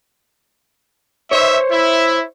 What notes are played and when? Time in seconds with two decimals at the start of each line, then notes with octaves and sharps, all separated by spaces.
1.31 D#4 C5 C#5 E5
1.71 E4 E5